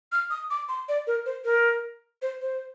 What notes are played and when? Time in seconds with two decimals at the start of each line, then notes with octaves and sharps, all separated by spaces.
0.12 F6
0.30 D#6
0.50 D6
0.69 C6
0.89 D5
1.07 A#4
1.26 C5
1.45 A#4
2.22 C5
2.41 C5